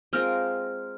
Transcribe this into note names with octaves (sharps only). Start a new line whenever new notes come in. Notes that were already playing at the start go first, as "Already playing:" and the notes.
G#3 C4 F4 A#4 F6